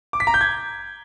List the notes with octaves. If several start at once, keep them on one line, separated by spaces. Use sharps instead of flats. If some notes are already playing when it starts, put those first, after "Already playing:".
D6
B6
A#5
G6
G#6